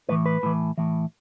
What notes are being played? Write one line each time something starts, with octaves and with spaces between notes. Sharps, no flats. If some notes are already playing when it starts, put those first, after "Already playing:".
A2 E3 B4
B4
A2 E3
A2 E3